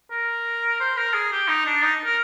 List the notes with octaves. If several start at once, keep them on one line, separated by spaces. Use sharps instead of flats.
A#4
C5
A#4
G#4
G4
D#4
D4
D#4
A#4